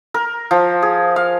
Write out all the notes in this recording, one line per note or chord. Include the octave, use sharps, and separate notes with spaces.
A#4
F3
G#4
F5